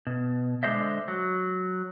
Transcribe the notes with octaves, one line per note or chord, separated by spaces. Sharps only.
B2
D3 G#3 A4 C5 D#5 E5
F#3